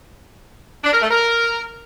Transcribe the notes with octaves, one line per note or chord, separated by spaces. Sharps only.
D4
A#4
A3
A#4